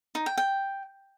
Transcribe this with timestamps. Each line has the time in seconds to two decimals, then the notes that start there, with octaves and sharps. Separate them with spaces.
0.15 D#4
0.26 G5
0.38 G5